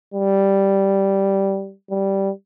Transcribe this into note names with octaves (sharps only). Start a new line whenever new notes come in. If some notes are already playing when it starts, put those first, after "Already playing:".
G3
G3